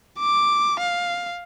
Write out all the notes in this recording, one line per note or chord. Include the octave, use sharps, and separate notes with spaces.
D6
F5